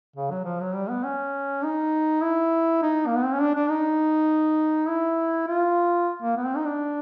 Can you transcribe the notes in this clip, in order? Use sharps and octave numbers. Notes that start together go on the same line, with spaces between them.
C#3
F#3
F3
F#3
G3
B3
C#4
D#4
E4
D#4
A#3
B3
C4
C#4
D4
D4
D#4
E4
F4
A#3
B3
C4
D#4
D4